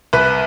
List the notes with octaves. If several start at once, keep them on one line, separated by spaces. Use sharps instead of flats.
C2 B4